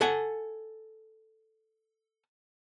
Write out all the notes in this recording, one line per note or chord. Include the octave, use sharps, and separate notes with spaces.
A4 F#5 G#5